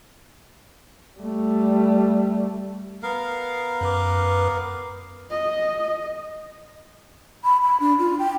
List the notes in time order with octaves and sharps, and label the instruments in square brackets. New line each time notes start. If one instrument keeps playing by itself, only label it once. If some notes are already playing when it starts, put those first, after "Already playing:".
[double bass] G3 A3
[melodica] B3 A#4 F5
[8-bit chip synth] F#2 B4 D6
[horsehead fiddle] D#5
[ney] B5
B5
D4
F4
G5